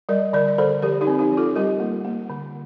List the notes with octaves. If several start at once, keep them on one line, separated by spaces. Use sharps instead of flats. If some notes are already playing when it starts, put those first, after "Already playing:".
G3 A#4 D5
D3 A#4 D5
D5
D3 A4 C5
F3 G4 A#4
D#4 G4
C4
D#4 G4
F3
F4 A4
G3 G4 A#4
A#3
A#3
D3